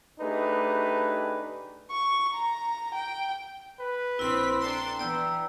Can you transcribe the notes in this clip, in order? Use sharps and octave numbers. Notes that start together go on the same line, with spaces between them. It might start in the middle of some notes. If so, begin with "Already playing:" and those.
A3 D4 D#4 G4 G#4 B4
C#6
A#5
G5
B4
A#1 C4 E4 C6 E6 B6
D4 A4 G5 A#5 C6
E3 B3 D5 G5 A#5 E6